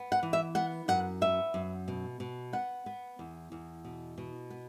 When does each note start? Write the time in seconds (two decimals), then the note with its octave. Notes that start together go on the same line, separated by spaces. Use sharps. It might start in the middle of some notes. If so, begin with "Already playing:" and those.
Already playing: B3
0.12 F#5
0.23 E3
0.33 E5
0.55 B3 F#5
0.88 F#2 F#5
1.21 B3 E5
1.54 F#2
1.88 B2
2.20 B2
2.53 B3 F#5
2.86 B3
3.19 E2
3.52 E2
3.84 B2
4.18 B2
4.50 B3